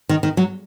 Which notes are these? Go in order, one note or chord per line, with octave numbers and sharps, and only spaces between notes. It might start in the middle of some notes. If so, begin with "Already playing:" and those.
D#3
D#3
F#3